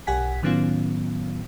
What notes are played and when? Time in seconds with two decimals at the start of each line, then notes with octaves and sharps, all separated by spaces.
0.07 B1 G4 F#5 G#5 B6
0.42 A2 D#3 F#3 B3 C#4 F4